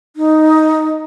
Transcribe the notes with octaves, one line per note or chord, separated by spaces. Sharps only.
D#4